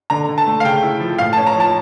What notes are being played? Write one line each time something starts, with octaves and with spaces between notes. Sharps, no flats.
D3 A#5
D3
A5
A3
F5
C#3 G5
E4
F3
A2 F5
A5
C#4
A#5
F3 A5